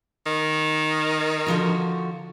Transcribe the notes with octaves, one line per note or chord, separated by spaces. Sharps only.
D#3
D3 F3 F#4